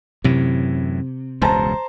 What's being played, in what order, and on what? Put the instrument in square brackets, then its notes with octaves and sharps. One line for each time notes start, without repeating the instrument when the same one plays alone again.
[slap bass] F#2 A2 E3 [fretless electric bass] C3
[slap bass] E1 C#2 G2 [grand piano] C5 A5 A#5